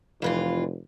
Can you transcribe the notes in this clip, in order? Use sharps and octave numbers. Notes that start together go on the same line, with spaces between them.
F1 F2 E3 F4